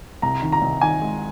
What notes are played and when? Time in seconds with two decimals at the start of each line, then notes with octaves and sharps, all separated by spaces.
0.22 C2 A#5
0.42 D#3
0.52 A#5
0.62 C2
0.81 D#3 G#5
1.02 G#3